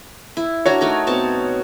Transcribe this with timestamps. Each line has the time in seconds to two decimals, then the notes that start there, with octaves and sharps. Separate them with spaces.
0.37 E4
0.66 D4 F#4 A#4 C#5
0.81 A3 D#4 A#4
1.07 B2 C4 A5